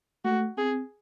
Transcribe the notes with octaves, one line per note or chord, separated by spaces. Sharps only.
A3 F#4
C4 G#4